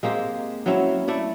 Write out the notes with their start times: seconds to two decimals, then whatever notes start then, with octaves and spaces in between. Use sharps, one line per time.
0.03 G#3 A#3 C4 G4
0.66 F#3 C4 C#4 E4
1.08 A3 E4 D5